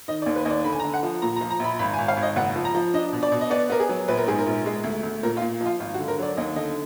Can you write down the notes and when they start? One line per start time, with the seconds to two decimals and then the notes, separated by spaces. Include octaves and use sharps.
0.08 D#3 D#5
0.22 D5
0.26 D#2
0.36 B4
0.45 D#2 D#5
0.51 D5
0.64 D3 B5
0.73 G#5
0.80 A#5
0.84 D3
0.94 F#5
1.03 F3
1.22 A#2 A#5
1.36 A#5
1.41 F3
1.50 A#5
1.60 A#1 B5
1.79 G#1 B5
1.94 G#5
1.98 G#1
2.08 F5
2.17 G#1
2.22 D#5
2.36 F#1 F#5
2.56 F3
2.65 A#5
2.75 F3
2.94 D4 D#5
3.13 B2
3.23 D5
3.32 B2
3.41 D#5
3.50 B3 D5
3.70 B3 A#4
3.80 G#4
3.89 F#3
4.08 A#1 B4
4.18 A#4
4.27 G#2 G#4
4.39 A#4
4.46 A#1
4.66 G#3
4.84 D2
5.03 D2
5.23 A#2 A#4
5.37 F4
5.42 A#2
5.61 F3 F4
5.80 G#1 F4
5.94 F#4
5.99 D3
6.08 A#4
6.19 F#3 D5
6.37 D#2 D#5
6.56 D3 D#5